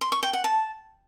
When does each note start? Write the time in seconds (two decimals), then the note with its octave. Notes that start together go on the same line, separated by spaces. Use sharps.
0.01 C6
0.12 C#6
0.23 G5
0.33 F#5
0.44 A5